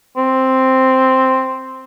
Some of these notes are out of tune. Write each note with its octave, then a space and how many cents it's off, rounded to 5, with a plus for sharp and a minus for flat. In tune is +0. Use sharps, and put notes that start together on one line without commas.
C4 +0